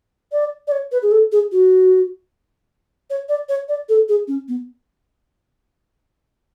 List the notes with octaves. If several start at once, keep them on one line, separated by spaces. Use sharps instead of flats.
D5
D5
C#5
B4
G#4
A4
G#4
F#4
C#5
D5
C#5
D5
A4
G#4
C#4
B3